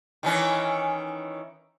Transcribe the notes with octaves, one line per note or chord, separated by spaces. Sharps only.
D#3 E3 C#4